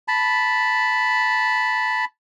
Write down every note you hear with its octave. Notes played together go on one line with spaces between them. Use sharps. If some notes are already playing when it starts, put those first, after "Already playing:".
A5 B5